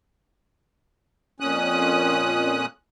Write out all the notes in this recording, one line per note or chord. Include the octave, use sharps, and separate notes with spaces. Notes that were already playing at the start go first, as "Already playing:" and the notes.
F2 A#2 C#4 D#6 F#6